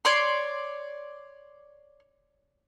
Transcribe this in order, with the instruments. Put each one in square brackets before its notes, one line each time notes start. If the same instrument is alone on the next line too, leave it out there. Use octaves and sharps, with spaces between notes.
[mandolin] C#5 D5 C6